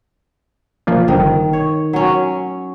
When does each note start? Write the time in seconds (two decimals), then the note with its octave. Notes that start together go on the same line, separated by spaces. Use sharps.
0.87 A#2 F3
1.08 G1 D#3
1.53 C#5
1.93 F#3 C#4